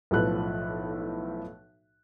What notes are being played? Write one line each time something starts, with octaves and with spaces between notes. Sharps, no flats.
B1 A2 F3 A4 B4 F#6